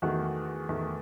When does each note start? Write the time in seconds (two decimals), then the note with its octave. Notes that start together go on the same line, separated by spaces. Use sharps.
0.02 E2 D#3 A3 F#4
0.69 E2 D#3 A3